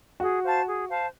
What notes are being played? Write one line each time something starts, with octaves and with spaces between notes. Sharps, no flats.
F#4 G#4
C5 F5 A5
G#4
C5 F5 A5